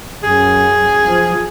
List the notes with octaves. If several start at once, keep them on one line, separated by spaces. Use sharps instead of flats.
F#2 G#4
F3